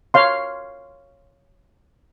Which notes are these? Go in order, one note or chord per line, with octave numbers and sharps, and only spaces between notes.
C#5 F5 C6